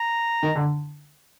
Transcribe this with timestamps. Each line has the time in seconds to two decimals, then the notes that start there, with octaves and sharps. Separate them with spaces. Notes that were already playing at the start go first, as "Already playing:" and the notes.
Already playing: A#5
0.43 D#3
0.55 D3